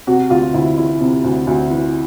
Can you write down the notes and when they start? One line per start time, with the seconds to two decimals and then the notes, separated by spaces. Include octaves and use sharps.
0.07 C3 F#4
0.30 D2 F4
0.54 D2 E4
0.77 E3 E4
1.01 C3
1.24 D2
1.47 D2
1.71 E3